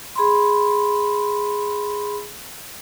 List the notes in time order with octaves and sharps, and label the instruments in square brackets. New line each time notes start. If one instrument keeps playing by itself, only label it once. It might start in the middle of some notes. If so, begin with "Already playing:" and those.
[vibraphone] G#4 B5 C6